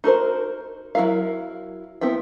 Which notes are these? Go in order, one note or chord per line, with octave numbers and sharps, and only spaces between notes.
D#4 F#4 A#4 C5
F#3 C#4 E4 A#4 F5
B3 C4 E4 G5